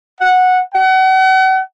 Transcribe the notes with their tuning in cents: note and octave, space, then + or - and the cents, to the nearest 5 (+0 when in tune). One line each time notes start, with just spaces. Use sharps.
F#5 -10
F#5 +35